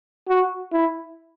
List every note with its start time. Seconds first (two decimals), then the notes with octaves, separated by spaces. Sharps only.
0.28 F#4
0.72 E4